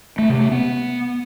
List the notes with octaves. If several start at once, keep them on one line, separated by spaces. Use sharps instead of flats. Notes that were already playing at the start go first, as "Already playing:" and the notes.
A3
C3
A3
B3